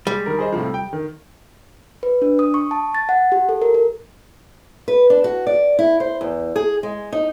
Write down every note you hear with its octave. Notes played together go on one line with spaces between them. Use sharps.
G3 G#3
D#3 A#4
G#4 C5 D#5
A2 C3 F3
G5
D#3
B4
D4
D#6
C#6
A5
A6
F#5
G4
A4
A#4
A#4
B4
D4
F#4
D5
E4
C5
E2
G#4
G#3
D#4